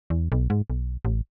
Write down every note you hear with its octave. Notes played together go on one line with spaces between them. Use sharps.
E2
B1
G#2
B1
A1